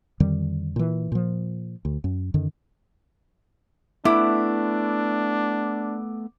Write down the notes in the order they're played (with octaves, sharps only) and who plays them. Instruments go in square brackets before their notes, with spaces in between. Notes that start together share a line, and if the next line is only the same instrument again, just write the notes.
[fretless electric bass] F2 D3 D#3 G3
A#2 E3
A#2 F3
D2
F#2
F#2 D3 D#3
[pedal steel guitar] A3 B3 [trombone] D4 [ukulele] E4 [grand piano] D6